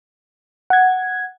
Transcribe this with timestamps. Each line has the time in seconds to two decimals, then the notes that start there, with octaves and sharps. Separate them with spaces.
0.70 F#5 G#6